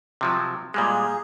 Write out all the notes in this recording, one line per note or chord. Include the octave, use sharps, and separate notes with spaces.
C3 F3 F#3
A#2 G3 G#3 G#4